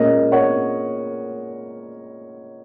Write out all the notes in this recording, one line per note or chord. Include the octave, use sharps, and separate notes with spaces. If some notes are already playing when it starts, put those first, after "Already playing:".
Already playing: A#2 G#3 C#4 A#4 D#5
C#5 F#5